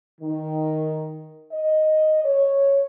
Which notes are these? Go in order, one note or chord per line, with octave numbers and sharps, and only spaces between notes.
D#3
D#5
C#5